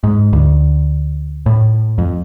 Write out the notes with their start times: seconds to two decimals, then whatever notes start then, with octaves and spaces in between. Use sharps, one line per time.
0.04 G#2
0.33 D2
1.46 A2
1.98 F2